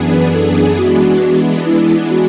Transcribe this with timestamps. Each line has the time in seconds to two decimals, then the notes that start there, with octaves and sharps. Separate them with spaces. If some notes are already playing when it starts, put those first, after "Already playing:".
Already playing: F#2 E3 B3 D4 G#4
0.11 B4
0.33 A4
0.55 G#4
0.77 E3 G#3 B3 D4 F#4
1.66 E4
2.10 F#4